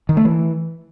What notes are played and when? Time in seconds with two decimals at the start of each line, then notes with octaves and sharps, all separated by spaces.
0.09 D#3
0.17 A3
0.25 E3